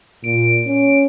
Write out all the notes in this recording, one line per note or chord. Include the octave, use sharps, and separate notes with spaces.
A#2 D7
C#4